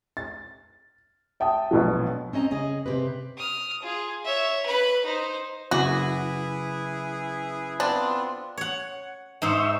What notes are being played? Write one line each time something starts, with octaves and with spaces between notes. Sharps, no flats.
A6
E5 G5 A5 D#6
A#1 B2 F#3
C4 C#4 D#5 A5 A#5
C#3 C#4 G#4 D#5
C3 C4 G4 B4
D#6 F6
F4 G#4
C#5 E5
B4 B5
D#4 C5
F#1 E4 F#4 G#4 B4 D6
B3 C4 D4 F4
C#5 F#5
G#2 D#4 C5 E5 C#6 E6